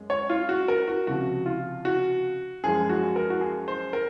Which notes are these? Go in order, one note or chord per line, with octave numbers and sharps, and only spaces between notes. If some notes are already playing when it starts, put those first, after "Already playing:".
Already playing: F#2 G#3
C#5
F4
F#4
A#4
F#4
C#2 C3 F3 F#4
F4
F#4
F#2 F3 G#3 G#4
F#4
A#4
F#4
G#4
C5
A#4